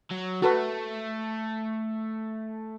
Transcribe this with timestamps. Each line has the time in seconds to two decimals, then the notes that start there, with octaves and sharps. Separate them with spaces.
0.11 F#3
0.42 A3 F#4 A4 B4